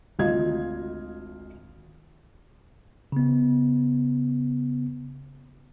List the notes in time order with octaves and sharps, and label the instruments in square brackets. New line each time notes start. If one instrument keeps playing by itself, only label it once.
[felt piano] G#1 D2 F4 D#5 G#6
[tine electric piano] C#3 B3